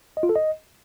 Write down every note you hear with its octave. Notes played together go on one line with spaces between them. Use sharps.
D#5
F4
A4
D#5